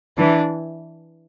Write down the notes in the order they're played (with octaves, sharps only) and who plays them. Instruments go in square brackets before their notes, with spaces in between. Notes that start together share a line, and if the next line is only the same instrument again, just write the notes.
[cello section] E3 [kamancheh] D4